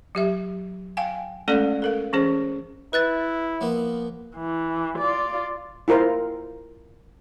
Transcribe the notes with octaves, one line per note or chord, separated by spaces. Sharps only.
F#3 G4 E5
F5 G5 G#5
G#3 A3 C#4 A4 D5
A4 A#4 F5
E3 C#4 G#4 C5
E4 B4 F#6 A6
F3 A#3 B3
E3
F4 D5
E4 F4 A#4 C5 F5